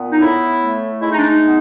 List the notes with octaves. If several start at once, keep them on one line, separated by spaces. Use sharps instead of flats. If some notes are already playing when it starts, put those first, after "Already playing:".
Already playing: A#2 B3
D#4
A2 E4
A3
G#3 E4
D#4
D4
D#4
B3